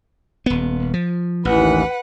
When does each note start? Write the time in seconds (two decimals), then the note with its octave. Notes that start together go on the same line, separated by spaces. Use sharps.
0.46 D#1 B3
0.94 F3
1.45 A1 D#2 E3 B4 F#5